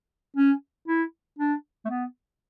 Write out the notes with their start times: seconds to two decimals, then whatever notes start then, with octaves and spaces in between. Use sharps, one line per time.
0.36 C#4
0.88 E4
1.38 D4
1.85 A3
1.90 B3